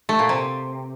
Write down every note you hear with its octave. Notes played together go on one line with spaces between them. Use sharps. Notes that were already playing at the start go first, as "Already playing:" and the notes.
A3
A#2
C3